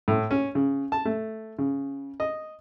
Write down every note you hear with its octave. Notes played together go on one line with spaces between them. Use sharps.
A2
C#4
C#3
A5
A3
C#3
D#5